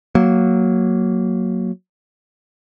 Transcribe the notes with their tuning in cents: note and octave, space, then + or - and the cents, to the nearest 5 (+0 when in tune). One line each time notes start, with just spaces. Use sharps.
F#3 +0 A#3 -5